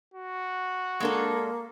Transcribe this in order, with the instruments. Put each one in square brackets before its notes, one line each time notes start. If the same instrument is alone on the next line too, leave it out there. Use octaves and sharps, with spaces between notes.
[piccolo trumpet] F#4
[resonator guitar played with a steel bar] G#3 D4 A4 [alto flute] A#3